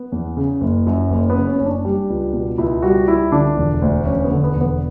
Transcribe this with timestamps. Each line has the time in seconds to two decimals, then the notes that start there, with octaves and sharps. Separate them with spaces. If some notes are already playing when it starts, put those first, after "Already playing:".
Already playing: B3
0.12 E2
0.37 C#3
0.61 F#1
0.87 F#2
1.10 F#1 C#4
1.30 B3
1.36 C#3
1.47 C#4
1.59 F#1 C#4
1.66 D4
1.85 G3
2.10 C#2
2.33 B2
2.58 C#2 E4
2.82 G3 F#4
3.08 C#2 E4
3.32 D3 D4
3.57 E1
3.82 D2
4.06 E1 C#4
4.24 B3
4.31 D3
4.44 B3
4.56 E1
4.61 B3